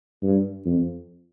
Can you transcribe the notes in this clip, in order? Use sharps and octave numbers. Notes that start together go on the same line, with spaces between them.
G2
F2